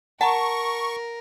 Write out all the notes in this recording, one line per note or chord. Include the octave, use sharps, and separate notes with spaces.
A#4 F#5 A5 A#5 C#6